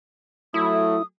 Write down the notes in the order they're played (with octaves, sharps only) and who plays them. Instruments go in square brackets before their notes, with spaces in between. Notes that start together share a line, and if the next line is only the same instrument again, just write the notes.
[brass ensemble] F#3 A3 [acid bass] E4 [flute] D#6